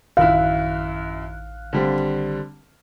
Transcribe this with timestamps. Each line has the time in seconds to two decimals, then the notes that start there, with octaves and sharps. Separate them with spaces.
0.17 A1 F#2 D#3 E4 F5 F#6
1.73 D3 G3 C4